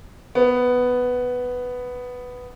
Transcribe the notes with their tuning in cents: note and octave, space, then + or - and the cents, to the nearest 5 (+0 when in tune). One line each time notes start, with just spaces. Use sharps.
B3 +5